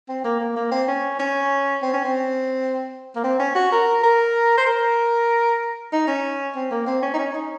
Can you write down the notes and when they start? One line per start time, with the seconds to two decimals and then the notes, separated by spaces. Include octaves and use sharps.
0.09 C4
0.24 A#3
0.40 A#3
0.56 A#3
0.71 C4
0.88 C#4
1.19 C#4
1.82 C4
1.93 C#4
2.05 C4
3.15 A#3
3.23 C4
3.39 C#4
3.55 F#4
3.72 A#4
4.03 A#4
4.58 C5
4.66 A#4
5.92 D#4
6.07 C#4
6.56 C4
6.71 A#3
6.87 C4
7.03 C#4
7.14 D#4
7.18 C#4
7.34 D#4